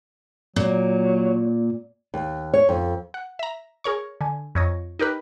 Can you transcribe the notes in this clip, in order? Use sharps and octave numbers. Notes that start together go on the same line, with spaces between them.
A#2 F#3
D#2
C#5
F2
F#5
E5 A#5
G#4 A#4 C#5 C#6
D3 G#5
F2 C#5 D#5
D#4 G4 A#4 B4